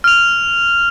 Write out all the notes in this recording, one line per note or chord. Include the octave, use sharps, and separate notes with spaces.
F6 F7